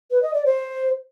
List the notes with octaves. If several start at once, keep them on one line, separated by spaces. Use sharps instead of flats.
B4
D#5
D5
C5